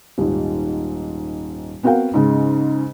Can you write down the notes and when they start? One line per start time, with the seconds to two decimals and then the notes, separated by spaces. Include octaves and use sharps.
0.18 D#1 G#2
1.83 B3 C4 F#4 A#4 F5 G5
2.14 G#2 C#3 G#3